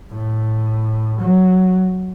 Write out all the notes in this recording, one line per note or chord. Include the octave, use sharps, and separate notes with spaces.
A2
F#3